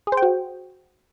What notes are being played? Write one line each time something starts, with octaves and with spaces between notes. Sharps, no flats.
G#4
C5
G5
F#4